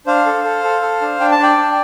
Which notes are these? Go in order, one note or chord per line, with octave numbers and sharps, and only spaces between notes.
D4 C5 F5
A4
A4
A4
A4
D4
D4 G5
A5
D4 D5 G5
D4